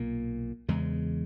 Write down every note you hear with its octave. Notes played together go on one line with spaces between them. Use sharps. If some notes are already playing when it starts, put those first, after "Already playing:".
Already playing: B1 A#2 A#3
E2 C#3 G#3